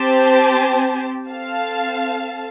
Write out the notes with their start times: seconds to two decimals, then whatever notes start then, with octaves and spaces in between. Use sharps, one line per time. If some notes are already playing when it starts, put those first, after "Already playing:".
Already playing: C4 G4 C5 A5
1.30 C4 A4 F5 A5